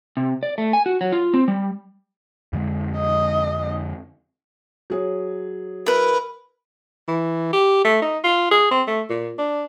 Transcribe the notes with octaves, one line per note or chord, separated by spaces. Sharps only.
C3
D5
A3
G#5
F#4
F#3
F4
C4
G3
F2 D3 G#3
D#5
F#3 G#4 C#5
E4 A#4 B4
E3
G4
A3
D#4
F4
G#4
C4
A3
A#2
D4